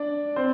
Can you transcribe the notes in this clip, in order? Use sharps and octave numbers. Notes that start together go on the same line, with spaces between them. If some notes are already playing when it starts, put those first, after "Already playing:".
Already playing: D4 D5
C4 C5